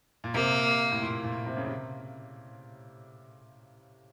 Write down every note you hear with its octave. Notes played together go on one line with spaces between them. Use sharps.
A#2
C3 A#3
A2
A#2
A#2
C3
C#3
C3